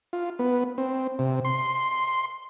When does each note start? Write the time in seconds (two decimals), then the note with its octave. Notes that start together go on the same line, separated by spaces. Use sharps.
0.13 F4
0.39 B3
0.78 C4
1.19 C3
1.45 C6